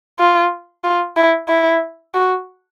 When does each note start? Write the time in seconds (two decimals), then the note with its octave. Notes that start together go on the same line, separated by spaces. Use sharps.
0.19 F4
0.84 F4
1.17 E4
1.49 E4
2.15 F#4